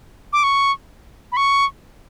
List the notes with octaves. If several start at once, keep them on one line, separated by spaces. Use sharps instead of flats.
D6
C#6
B5
C#6